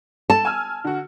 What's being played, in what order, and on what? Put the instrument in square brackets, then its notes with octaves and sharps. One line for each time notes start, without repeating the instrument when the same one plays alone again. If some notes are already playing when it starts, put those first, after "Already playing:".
[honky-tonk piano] A4 [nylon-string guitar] A5
[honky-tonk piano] G#5 E6 F6
D3 F#4